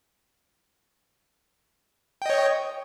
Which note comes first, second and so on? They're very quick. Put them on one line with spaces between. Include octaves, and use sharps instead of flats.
G5 D#5 C#5